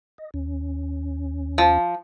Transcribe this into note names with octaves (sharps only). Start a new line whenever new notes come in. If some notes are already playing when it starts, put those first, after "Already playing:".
D#5
D#2 C#4
F3